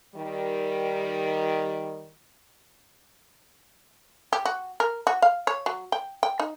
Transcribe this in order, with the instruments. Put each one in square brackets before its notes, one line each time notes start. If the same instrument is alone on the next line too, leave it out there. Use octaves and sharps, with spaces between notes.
[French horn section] D#3 G3
[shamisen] G4
F#4
A#4
F#4
F5
C#5
F#3
G5
G5
D#4